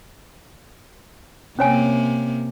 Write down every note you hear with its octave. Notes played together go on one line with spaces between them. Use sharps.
C3 A#3 C#4 C#5 G#5